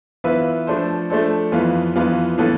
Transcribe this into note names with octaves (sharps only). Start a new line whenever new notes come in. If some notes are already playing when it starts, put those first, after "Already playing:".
E3 B3 F4 B4 E5
F3 A3 D4 A4 C5
F3 A3 D4 A4 C5
F2 E3 B3 F4
F2 E3 B3 F4
A2 E3 B3 F4 A4